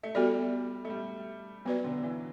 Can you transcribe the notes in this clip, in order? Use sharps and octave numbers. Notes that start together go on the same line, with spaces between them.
A3
G3 B3 F#4 A4 D5
A3
G3
F#3 B3 F#4 B4 D5
D3
E3